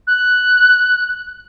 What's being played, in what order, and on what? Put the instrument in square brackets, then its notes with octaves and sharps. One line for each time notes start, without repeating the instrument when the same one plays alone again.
[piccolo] F#6